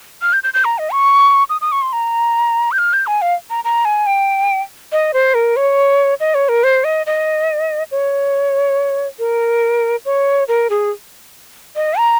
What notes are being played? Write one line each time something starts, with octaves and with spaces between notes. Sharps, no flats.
F6
G6
G6
G6
A#5
D#5
C#6
D#6
D#6
C#6
C6
A#5
G6
F6
G6
G#5
F5
A#5
A#5
G#5
G5
D#5
C5
A#4
C#5
D#5
C#5
A#4
C5
D#5
D#5
C#5
A#4
C#5
A#4
G#4
D#5
A#5